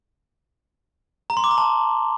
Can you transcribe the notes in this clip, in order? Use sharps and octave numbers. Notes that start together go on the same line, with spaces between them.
A#5
C6
D6
A#5
A5